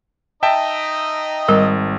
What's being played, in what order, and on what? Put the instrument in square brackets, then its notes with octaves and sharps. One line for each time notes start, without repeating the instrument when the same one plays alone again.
[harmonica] D#4 D#5 A#5 [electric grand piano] E5 G5 A5
[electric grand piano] G#1 [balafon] G3 A#4